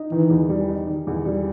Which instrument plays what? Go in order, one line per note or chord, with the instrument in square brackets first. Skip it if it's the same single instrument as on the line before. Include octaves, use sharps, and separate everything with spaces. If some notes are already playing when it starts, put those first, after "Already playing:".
Already playing: [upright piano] D#4
[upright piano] D#3 [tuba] E3
[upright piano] E2
G3
D#4
D#3
E2
G3